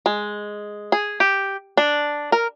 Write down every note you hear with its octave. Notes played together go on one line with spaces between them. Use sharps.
G#3
G#4
G4
D4
A#4